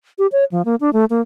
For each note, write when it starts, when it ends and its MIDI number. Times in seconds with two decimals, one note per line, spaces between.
0.18 0.27 67
0.32 0.44 73
0.52 0.62 53
0.65 0.75 58
0.81 0.93 62
0.93 1.05 57
1.10 1.21 58